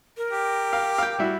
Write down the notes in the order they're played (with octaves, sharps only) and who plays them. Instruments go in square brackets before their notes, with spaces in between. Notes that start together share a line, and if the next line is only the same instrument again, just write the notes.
[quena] A#4
[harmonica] G4
[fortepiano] F5
F5 G5
G3 E4 F#4